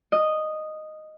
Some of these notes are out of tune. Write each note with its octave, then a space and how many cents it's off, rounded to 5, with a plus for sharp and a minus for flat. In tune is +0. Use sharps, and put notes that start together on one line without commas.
D#5 -5